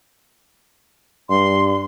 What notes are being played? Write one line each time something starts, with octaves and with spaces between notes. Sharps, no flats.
G2 C6